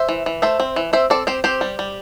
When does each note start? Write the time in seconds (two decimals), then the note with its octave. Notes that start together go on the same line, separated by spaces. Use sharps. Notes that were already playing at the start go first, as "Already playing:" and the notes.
Already playing: C5 E5
0.09 E3
0.26 E3
0.42 A3 C5 E5
0.60 C4
0.76 E3
0.93 C4 C5 E5
1.10 C4 A4 D5
1.27 C4 G4 C5
1.44 C4 G4 C5
1.61 G3
1.79 G3